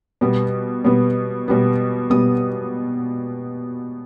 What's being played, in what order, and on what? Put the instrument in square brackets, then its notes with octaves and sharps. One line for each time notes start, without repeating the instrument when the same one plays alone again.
[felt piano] B2 G3 B3
B2 G3 B3
B2 G3 B3
B2 G3 B3 D#6